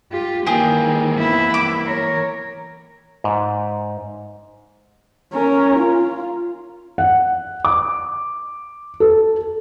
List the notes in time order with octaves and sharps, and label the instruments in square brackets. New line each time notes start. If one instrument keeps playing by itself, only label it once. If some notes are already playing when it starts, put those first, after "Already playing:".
[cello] F4 G4
[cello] D#3 [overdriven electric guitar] E3 A#3 [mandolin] G4 G#4
[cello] B3 E4
[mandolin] D6
[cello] A#4 C#5
[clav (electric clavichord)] G#2
[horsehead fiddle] C#4 A#4
F4
[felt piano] F#5
D6
A4